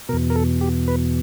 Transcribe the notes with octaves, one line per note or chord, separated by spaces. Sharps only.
E2 B2 A#4
A#4
A4
G4
B4